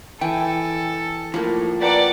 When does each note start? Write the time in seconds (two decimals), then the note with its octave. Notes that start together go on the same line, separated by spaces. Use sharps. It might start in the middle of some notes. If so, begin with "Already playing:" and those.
0.21 E3 A4 G5 G#5
1.34 A2 F3 A#3
1.82 B4 D5 F#5 G5 A5 A#5